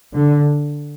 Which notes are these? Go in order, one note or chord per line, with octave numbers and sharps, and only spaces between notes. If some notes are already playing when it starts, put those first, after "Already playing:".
D3